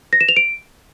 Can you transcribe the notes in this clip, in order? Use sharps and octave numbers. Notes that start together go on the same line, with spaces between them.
A#6
E7
F7
D7